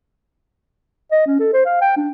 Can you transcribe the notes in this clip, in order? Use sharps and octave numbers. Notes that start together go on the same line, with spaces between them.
D#5
C#4
A4
C5
F5
G5
D4